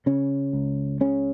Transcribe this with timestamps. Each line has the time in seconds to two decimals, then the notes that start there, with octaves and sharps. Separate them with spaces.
0.06 C#3 C#4
0.53 C#2
1.01 C#3 C#4